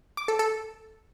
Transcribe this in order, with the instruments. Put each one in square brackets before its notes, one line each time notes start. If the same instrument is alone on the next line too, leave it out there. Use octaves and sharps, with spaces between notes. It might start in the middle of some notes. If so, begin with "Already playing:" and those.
[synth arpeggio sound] D6
A4
A4